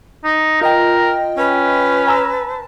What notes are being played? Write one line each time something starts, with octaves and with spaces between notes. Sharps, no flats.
D#4
F4 A#4 D#5 G5
C#4 B4
G#5 A#5 E6
A5